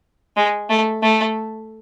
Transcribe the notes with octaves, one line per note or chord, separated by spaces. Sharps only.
G#3
A3
A3